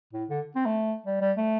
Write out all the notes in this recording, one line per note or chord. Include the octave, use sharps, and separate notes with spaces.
A2
D3
C4
A3
G3
G3
A3